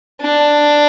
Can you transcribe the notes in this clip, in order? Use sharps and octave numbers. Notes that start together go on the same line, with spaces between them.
D4